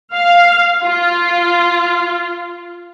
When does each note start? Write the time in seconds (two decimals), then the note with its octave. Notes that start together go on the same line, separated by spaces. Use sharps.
0.14 F5
0.82 F4